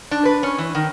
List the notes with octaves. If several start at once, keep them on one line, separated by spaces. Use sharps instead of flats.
D4
B4
C#4
E3
D#3